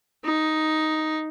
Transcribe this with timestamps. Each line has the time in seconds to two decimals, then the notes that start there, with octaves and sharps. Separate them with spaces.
0.25 D#4